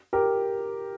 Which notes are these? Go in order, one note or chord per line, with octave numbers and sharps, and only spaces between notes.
G4 A#4